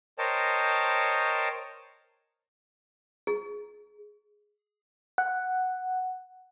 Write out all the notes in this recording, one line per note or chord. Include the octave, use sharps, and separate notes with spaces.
A#4 C5 C#5 D#5 G5 A5
G#4
F#5